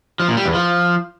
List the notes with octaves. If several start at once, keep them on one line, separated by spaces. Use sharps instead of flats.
F3
A#2
G3
E2
F3